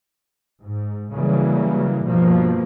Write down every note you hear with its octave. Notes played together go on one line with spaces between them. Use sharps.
G#2
C#3 E3 F#3 G3 A#3
G2 B2 F3 A#3